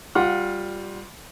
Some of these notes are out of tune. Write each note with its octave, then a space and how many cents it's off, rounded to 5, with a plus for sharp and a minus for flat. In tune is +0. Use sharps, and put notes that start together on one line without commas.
G3 +0 F4 +15 F#5 +0